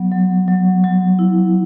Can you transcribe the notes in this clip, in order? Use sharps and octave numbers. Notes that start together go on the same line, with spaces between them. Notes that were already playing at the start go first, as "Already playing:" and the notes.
Already playing: F#3 B3
F#3
F#3
F#3
E4